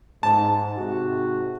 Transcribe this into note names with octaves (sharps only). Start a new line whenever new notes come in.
G#2 A5
G#2 C3 F#4